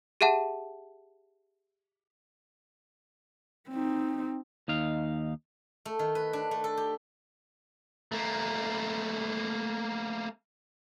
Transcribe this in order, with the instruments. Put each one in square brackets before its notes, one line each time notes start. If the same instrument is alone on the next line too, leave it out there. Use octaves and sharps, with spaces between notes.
[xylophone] G4 G#4 E5 F#5 A5
[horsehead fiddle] C4 D#4
[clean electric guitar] D#2 D#4 F5
[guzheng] A3
D#3
B4
D4
A3
A4
G4
[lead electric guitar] A3 A#3